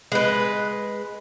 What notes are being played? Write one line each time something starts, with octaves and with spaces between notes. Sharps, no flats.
G#3 B4